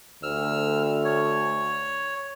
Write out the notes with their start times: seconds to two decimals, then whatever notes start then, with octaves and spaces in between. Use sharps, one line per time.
0.23 D2 E6 F6
1.05 C#5